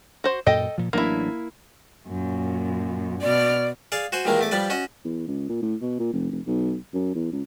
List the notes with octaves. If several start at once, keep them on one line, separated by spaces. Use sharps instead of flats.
F#4 C5
F#2 A#2 A4 D#5 G5
A#2 F3
A1 F#3 A#3 D4 E4
F#2 A#2
B2 D5 F6
G#4 D5 F5
F#4 C5 F#5 G#5
D#2 A#2 D#3 E3 G#3 A#3
E2 A3 D6
F3 G3 B4 D5
C#4 F#4 D#5
E2
C#2
A#2
A2
B2
A#2
F1
F1
B1
F#2
E2
C#2